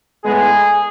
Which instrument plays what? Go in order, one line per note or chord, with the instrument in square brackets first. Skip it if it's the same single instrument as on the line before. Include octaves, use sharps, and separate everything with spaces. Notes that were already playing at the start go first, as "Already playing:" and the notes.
[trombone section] A2 G#3 B3 G#4